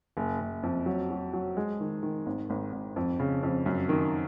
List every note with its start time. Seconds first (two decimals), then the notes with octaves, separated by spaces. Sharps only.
0.17 F#1
0.40 F#1
0.63 F2
0.86 F#3
1.10 F#3
1.33 F#3
1.57 G#3
1.80 D#3
2.03 D#3
2.26 G#1
2.50 G#1
2.73 G#1
2.96 F2
3.20 C#3
3.43 F2
3.66 F#2
3.89 D#3